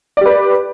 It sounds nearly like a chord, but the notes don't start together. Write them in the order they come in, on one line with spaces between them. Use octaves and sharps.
D5 G4 B4